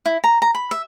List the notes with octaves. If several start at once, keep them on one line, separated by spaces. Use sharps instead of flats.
E4
A#5
A#5
B5
E5